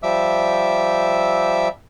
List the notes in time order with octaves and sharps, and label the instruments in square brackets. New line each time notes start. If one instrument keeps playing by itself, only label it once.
[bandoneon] F3 G3 E5 D6 E6